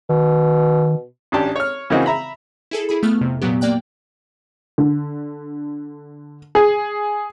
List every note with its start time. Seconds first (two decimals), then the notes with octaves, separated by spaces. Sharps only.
0.09 B2 D#3
1.32 G#1 C#4 D4 G4 A5
1.56 C#5 F6
1.90 C#3 E3 A#3 C4 D#4 F#4
2.06 E5 A#5 B5
2.71 E4 G#4 A4
2.89 E4 G#4 B5
3.03 A3 B3 F6
3.21 F2 C3
3.42 A#2 F#3 B3 G4
3.61 A#3 D5 G5 F#6
4.78 D3
6.55 G#4